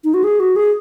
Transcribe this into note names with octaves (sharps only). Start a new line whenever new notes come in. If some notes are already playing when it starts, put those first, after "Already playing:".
D#4
F#4
G#4
F#4
G#4